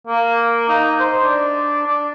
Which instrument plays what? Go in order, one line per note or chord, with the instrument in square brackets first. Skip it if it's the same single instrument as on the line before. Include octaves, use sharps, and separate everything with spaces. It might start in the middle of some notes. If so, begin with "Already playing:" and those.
[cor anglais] A#3
D#4
C5
D4
D4